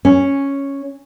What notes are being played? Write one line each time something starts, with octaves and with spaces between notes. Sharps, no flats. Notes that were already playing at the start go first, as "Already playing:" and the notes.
C#4